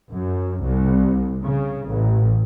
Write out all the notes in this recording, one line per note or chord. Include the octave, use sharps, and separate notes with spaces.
F#2
C2
C#3
A1